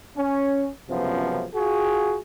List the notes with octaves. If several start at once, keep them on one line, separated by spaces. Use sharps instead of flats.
C#4
C#2 F#2 C3 F3 B3
F4 F#4 G#4